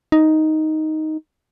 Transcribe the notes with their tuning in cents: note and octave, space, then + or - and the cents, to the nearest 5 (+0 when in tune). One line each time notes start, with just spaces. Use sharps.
D#4 +5